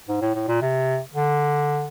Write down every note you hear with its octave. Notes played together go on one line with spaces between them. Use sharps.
G#2
A2
A2
A#2
C3
D3